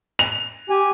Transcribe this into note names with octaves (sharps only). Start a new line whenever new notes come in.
F7
G4 G#5